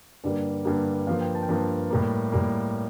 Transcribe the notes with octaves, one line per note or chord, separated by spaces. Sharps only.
G2 D3 G3 A#3 D5
G2 D3 G3 A#3
G2 F3 A#3 F5
G5
A5
G5
G2 F3 A#3 A5
A2 G3 A#3
A2 G3 A#3